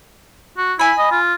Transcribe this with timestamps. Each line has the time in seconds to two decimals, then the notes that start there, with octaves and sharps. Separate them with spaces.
0.57 F#4
0.79 E4 G#5 B5
0.98 D#5
1.11 F4